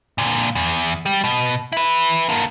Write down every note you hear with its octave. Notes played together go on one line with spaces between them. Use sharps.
A#2 D3
E2
G3
B2
E4 B4
D3 A#3